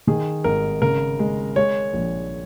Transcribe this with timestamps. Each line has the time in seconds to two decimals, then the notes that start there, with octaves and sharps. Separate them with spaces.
0.07 D#3 G#4
0.44 G#1 A#4
0.82 C#3 A#4
1.19 G#3
1.56 G#3 C#5
1.94 A#1